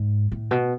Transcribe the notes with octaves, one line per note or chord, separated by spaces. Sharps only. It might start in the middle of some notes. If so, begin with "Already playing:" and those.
Already playing: G#2
A2
B2